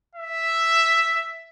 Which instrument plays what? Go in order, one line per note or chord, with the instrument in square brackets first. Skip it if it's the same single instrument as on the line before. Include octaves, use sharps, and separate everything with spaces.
[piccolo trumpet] E5